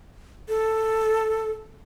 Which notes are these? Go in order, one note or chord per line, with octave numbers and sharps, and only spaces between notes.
A4